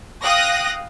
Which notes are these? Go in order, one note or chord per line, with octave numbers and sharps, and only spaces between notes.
F5 G5 D#6 F#6 A#6